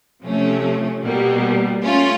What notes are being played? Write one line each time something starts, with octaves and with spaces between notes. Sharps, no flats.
C3 F3 A3 C#4
B2 G3 A#3
A3 C#4 F4